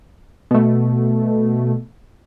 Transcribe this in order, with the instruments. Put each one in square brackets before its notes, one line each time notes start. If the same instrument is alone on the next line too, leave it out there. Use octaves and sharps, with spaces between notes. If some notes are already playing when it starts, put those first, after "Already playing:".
[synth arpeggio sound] B2 A3